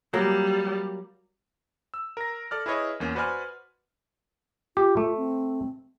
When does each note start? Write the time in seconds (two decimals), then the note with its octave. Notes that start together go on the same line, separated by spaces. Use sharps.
0.14 F#3 G3 A#3
1.94 E6
2.17 A#4 A#6
2.51 A4 D5 F6
2.66 E4 G#4 B4 C#5 D#5
3.00 E2 A#3 C#4
3.15 F#4 B4 C5 D5 G#5 F6
4.77 F4 G4
4.97 A3
5.17 C4